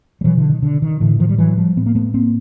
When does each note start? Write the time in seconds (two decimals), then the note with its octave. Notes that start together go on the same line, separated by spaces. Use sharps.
0.21 G3
0.24 B2 E3 F#3
0.37 D3 E3
0.50 D#3
0.62 D3
0.82 D#3
1.00 A2 D3 E3
1.19 D#3 F3
1.29 G3
1.38 E3 F#3
1.57 F3 G3
1.77 A2 B3
1.86 A#3
1.95 A3 B3
2.14 A#3 C4